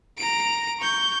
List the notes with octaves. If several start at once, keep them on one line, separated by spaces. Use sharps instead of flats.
A#5 D7
C#6 G6